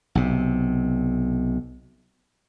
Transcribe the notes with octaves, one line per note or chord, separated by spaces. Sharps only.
B1 C3